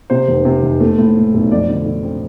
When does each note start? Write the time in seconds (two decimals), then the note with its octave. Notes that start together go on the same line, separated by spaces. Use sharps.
0.10 C3 C5
0.28 F1
0.45 C3
0.63 F1
0.80 A3
0.98 A2
1.16 A2
1.34 B1
1.51 F2 D5
1.69 D3
1.86 D3
2.03 C4